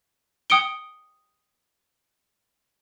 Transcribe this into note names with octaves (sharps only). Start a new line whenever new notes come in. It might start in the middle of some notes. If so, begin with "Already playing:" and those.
G5 D#6 C#7 D7 G7